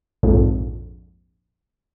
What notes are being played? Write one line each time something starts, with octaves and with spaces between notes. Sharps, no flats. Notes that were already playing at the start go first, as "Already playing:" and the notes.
A#1 F2 G#2